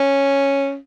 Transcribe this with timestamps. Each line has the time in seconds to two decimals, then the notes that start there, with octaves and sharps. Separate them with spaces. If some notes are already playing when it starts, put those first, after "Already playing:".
Already playing: C#4